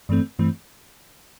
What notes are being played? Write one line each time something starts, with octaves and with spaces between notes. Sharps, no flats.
G2 E3 A3 C4
G2 E3 A3 C4